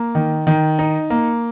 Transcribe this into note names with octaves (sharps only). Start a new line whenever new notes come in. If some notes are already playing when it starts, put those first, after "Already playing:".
Already playing: A#3
D#3
D#3
D#4
A#3